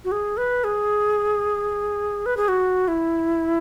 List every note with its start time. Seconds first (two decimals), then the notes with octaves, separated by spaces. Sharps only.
0.05 F#4
0.12 G#4
0.37 B4
0.64 G#4
2.26 B4
2.37 G#4
2.48 F#4
2.88 E4